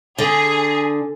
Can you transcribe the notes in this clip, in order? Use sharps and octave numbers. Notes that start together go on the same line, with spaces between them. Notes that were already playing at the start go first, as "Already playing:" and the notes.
D3 G#4